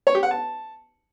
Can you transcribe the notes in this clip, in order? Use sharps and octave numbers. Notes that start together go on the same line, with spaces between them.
C#5
G4
F#5
A5